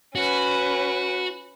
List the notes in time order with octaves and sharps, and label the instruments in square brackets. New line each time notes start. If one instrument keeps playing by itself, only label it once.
[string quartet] C#4 B4 [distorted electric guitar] F#4